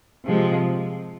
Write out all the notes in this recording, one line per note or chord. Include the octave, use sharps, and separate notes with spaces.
C3 F3 G#3